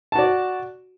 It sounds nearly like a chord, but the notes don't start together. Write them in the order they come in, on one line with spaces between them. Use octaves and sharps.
A5 F#4 D5